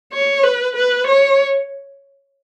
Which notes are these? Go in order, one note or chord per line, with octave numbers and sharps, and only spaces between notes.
C#5
B4
B4
C#5